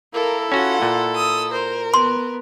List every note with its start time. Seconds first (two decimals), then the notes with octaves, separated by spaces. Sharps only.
0.14 A#3 E4 A4 A#4
0.52 C#4 F4 F#4 F#5
0.82 A#2
1.16 D#6 E6
1.52 A#4 C5
1.94 B3 C6